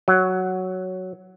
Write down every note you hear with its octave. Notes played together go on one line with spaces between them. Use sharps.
F#3